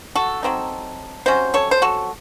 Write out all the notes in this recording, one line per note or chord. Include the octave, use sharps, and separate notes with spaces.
F#4 A4
F#3 A3 C4 D#4
C3 F#3 C#4 C5
A4 C#5
C5
F#4 A4